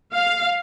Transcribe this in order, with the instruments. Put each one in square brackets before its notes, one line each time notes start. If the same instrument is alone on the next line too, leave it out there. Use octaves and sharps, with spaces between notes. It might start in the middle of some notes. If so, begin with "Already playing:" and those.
[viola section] F5